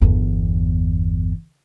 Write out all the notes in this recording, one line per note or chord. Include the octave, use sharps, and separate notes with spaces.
G1 E2